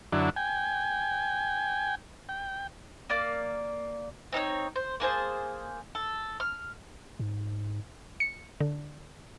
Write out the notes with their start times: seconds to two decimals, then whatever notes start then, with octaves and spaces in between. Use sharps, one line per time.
0.12 F#2 D3 F#3 D4 E4
0.36 G5 G#5
2.29 G5
3.10 A#3 D5 F6
4.33 C4 D#4 A4 C#5
4.76 C5
5.00 A#3 G#4 C5 A5
5.95 A4
6.40 F6
7.19 G#2
8.20 C#7
8.60 D3